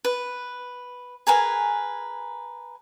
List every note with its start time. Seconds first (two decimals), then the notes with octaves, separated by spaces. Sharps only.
0.05 B4
1.27 G#4 A#4 B4 G#5